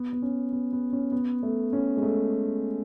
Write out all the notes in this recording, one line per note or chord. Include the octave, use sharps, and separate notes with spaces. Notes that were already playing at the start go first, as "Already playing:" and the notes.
Already playing: B3
B3
C#4
B3
B3
C#4
B3
A3
C#4
G#3
A3